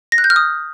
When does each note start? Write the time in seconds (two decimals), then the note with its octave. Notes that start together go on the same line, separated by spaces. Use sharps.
0.12 A#6
0.18 F#6
0.24 G6
0.30 F6
0.36 D#6